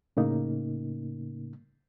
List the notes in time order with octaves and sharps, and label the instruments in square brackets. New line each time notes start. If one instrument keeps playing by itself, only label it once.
[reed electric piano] A2 C#3 A#3 D#4